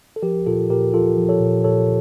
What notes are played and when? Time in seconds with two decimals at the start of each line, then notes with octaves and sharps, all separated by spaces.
0.16 A4
0.22 F3 G4 A#4
0.47 A#2 F4 A4
0.70 A#2 G4 A#4
0.94 F3 F4 A4
1.17 F3
1.29 A4 C#5
1.40 A#2
1.64 A#2 A4 C#5